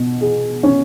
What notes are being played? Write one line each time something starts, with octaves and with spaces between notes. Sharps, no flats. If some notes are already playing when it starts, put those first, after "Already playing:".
Already playing: B2
G#4
C#4